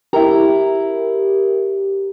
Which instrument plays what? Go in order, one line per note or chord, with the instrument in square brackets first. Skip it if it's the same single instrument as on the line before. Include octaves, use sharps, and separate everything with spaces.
[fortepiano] E4 A#5 [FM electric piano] G4 A#4